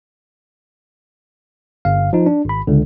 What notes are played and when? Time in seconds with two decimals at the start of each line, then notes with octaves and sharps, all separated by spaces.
1.85 G1 F5
2.13 F3 D#4
2.26 D4
2.45 G#1 B5
2.67 C#2 D3